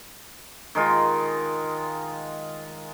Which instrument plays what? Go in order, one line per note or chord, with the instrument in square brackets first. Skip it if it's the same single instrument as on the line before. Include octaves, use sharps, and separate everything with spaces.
[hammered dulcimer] D#3 G#3 F4